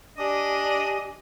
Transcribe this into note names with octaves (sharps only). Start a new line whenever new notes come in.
D4 G4 D#5 G#5